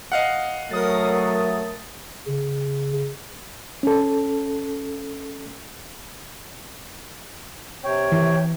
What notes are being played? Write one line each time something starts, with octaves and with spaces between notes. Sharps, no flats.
D#5 F5 F#5
F#3 A3 A#4 D#6 A6
C#3
C#4 A4
C3 C#5 G5
E3